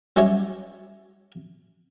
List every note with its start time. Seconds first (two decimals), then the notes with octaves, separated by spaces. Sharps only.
0.16 F#3 G3 C#4 E4 C#5 D#5